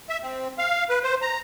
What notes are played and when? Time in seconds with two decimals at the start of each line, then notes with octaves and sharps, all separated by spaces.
0.09 E5
0.23 C4
0.58 F5
0.89 B4
1.03 C5
1.22 A#5